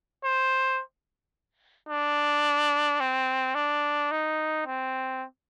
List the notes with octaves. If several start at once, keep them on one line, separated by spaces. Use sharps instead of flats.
C5
D4
C4
D4
D#4
C4